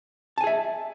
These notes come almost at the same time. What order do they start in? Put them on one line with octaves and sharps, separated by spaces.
A5 G#5 G#4 E5